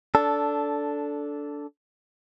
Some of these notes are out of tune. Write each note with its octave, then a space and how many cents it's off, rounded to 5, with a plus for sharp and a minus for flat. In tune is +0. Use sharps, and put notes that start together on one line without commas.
D4 -15 A4 +0